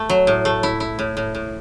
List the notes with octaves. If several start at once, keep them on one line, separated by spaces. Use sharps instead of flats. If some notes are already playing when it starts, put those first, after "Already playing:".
Already playing: A3
F#3
A2
A3
E4
E4
A2
A2
A2